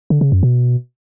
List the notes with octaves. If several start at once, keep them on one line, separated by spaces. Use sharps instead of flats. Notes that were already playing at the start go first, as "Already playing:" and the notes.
D3
C#3
F#2
B2